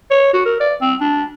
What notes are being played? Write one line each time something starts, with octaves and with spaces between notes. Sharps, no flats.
C#5
F#4
A#4
D5
C4
D4